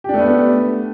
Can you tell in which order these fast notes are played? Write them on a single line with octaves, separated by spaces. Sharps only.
G4 D4 A3 B3